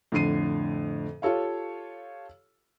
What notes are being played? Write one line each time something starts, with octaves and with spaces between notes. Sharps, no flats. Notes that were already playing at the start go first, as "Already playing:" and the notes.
F2 A2 D3 C7 D#7
F4 G4 A4 C#5 F5